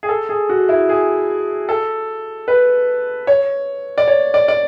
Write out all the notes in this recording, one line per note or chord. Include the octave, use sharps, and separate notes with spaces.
G#4
A4
G#4
F#4
E4
G#4
A4
B4
C#5
D5
C#5
D5
D5